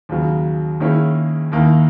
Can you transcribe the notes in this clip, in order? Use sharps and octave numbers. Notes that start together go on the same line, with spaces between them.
D#2 C#3 F#3
D#3 A#3 C#4 E4 G#4
D#2 D#3 A#3 E4 A#4